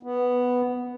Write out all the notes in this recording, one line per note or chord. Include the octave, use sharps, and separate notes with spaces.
B3